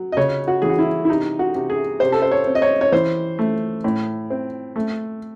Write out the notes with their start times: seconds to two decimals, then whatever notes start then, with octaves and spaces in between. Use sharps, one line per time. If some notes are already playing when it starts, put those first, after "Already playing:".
Already playing: F#3
0.12 D#5
0.17 C#3 C#5
0.48 F#4
0.62 E3 G#4
0.69 F#4
0.79 E4
1.05 E4
1.09 C3 D#4
1.39 F#4
1.55 C3
1.70 G#4
2.00 C3 C5
2.12 A4
2.22 C5
2.31 C#5
2.47 C4
2.55 D#5
2.62 C#5
2.81 C#5
2.92 E3 C5
3.39 A3
3.84 A2
4.30 C4
4.76 A3